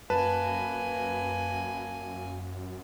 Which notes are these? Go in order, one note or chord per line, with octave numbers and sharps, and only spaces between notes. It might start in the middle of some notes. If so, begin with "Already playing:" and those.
F#2 A#3 B4 G#5 A5